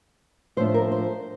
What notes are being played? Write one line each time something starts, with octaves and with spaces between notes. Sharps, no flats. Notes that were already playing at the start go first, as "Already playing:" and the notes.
A2 F3 A3 D4 C5
A#4
C5